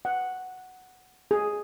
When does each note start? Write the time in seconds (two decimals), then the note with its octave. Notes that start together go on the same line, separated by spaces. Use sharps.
0.05 F#5
1.31 G#4